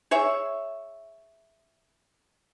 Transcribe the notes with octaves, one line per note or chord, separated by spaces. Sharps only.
G#4 C#5 E5